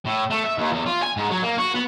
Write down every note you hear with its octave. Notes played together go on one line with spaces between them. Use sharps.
A2
A3
E5
D#2
E2
F4
G#5
G#2
F#3
A#3
F#4
B3